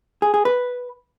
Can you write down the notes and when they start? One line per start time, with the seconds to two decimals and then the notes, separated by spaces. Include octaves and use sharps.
0.22 G#4
0.34 G#4
0.45 B4